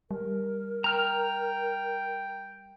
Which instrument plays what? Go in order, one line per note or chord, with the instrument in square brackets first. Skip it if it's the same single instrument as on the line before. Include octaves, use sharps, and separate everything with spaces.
[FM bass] G3 [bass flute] A#4
[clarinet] G5 [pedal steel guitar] A#5 F6